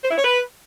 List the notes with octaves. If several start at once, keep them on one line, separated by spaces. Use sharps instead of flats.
C5
E4
C#5
B4